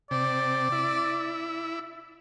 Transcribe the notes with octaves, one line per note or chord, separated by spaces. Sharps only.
C3 D5
E4